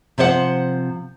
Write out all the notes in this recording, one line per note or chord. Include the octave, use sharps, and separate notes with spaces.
C3 F3 C5 C#5 F#5